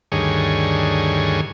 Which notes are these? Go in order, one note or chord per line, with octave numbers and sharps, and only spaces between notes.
D2 G2 D#3 G#4 C#5